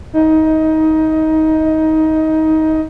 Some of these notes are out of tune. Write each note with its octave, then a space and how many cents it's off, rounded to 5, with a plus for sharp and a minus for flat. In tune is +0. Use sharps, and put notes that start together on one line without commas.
D#4 +20